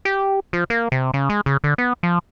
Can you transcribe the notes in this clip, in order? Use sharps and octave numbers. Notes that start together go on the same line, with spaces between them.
G4
F3
A#3
C3
C#3
G#3
C#3
D3
B3
F3